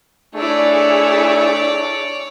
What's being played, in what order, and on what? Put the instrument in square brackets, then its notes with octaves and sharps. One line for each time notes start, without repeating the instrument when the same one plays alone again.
[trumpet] A3 [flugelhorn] D4 [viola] E4 G#4 [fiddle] C#5 D5